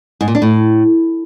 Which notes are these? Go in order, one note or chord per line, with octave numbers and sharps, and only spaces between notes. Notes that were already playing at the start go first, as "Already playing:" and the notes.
G#2
A#2
D4
A2